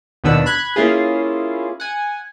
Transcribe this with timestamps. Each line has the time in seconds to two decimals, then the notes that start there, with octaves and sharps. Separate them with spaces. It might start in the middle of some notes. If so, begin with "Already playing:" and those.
0.24 D#2 B2 D#3 B3 D4 E6
0.46 B5 F#6 G#6
0.76 A#3 C#4 E4 F4 G#4
1.80 F#5 G#5